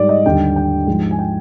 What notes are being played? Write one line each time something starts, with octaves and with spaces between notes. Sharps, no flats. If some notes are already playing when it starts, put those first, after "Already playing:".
Already playing: G#2 G3 D5
D#5
D#2 D3 G3 G5
G5
G#2 F3 G#3
G#5
G5